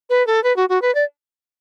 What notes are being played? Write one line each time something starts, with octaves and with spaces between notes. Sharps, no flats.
B4
A4
B4
F#4
F#4
B4
D5